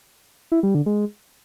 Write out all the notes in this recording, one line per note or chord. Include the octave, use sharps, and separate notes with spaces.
E4
G3
D3
G#3